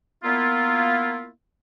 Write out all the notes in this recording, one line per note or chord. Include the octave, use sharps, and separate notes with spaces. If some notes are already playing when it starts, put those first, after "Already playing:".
A#3 B3 E4 F4